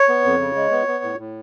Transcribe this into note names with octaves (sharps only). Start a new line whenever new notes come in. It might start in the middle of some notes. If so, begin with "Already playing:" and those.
Already playing: C#5
B3
F2
C#3
G#3
B3
B3
A2
A2